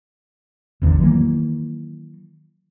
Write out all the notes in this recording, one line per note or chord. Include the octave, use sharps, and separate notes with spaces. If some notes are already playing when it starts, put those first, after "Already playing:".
G#1 E2 D3
D#3 E3 F#3 A#3